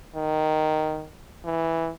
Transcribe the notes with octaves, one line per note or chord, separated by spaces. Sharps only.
D#3
E3